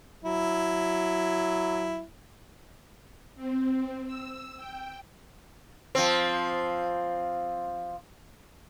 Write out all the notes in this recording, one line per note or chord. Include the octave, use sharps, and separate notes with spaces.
F#3 E4
C4
E6
G5
F3 C4